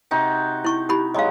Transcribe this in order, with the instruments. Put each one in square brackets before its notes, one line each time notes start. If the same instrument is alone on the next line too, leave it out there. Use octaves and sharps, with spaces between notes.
[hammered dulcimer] C3 D#4 F#4
[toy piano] E4 C#6
E4 G4 B5
[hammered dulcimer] F#3 G#3 [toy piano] D#5 F5